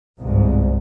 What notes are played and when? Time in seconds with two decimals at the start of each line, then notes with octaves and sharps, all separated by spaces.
0.20 G1 C2 G#2